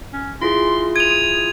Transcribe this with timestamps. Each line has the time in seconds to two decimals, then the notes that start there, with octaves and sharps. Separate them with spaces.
0.13 C#4
0.42 E4 F4 G#4 C6
0.96 D#6 G#6 F7